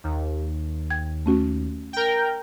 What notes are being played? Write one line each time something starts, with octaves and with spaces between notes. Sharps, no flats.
D#2
G5 G#6
A3 C#4 F#4
A#4 G5